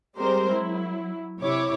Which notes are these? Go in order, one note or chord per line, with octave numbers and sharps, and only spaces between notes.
G3 G#3 C4 G4 A#4 C5
F#3 E4
C3 E4 C#5 D6